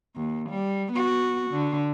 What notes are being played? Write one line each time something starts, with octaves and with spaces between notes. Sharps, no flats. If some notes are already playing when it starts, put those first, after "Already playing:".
D#2
G3
B3 F#4
D3